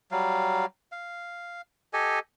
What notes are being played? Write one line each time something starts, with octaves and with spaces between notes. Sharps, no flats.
F#3 G3 F5
F5
G4 A4 D#5 G#5